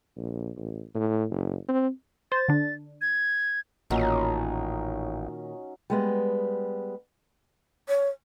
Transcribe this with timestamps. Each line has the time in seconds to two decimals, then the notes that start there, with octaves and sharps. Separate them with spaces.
0.17 A#1
0.57 A1
0.95 A2
1.30 F#1
1.69 C4
2.32 C5 A6
2.48 D3 D4
3.01 G#6
3.90 A1 A#2 D#3 F#3 C#4 D#4
5.90 G3 G#3 B3
7.88 C#5